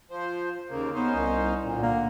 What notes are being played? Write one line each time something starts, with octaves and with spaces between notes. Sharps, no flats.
F3 C5
D#2 C#3 A#3
B3 C#4 D#4 C5
C2
A#2 D3
A#3